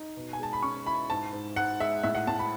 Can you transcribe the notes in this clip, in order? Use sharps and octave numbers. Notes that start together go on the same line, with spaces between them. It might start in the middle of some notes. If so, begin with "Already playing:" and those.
Already playing: D#4
B2
G#5
G#3 A5
B5
C#4 C#6
E4 B5
G#2 A5
G#2
G#2 F#5
G#3 E5
A2 E5
F#5
A2 A5
B5